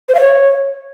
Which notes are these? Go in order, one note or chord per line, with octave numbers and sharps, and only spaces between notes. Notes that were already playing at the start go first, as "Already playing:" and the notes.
C5
F5
C#5